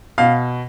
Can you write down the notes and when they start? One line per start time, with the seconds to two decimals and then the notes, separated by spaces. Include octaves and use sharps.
0.18 B2 F5